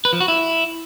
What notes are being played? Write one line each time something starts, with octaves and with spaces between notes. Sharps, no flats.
B4
F3
F#4
E4